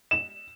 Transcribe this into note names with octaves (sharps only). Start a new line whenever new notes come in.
E7